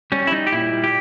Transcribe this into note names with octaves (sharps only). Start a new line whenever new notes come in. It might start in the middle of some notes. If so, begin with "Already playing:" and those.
G3 C#4
E4
G3 D#4
G4
A#2 E4
G3
G4